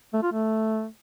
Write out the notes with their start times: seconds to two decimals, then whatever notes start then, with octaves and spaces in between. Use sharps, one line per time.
0.14 A3
0.23 F4
0.33 A3